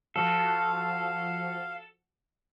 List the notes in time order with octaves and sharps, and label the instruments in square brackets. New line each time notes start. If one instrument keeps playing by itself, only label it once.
[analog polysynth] F3 F#4 [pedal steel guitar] A4 [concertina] F5